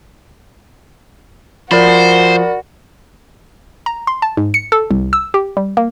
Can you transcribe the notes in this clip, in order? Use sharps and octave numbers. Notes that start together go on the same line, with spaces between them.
F3 F#4 A#4 C5 D5 B5
A#5
C6
A5
G#2
C#7
A4
C2
E6
G4
G3
A#3